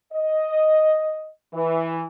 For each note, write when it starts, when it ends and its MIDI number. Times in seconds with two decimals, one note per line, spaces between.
0.14 1.28 75
1.54 2.02 52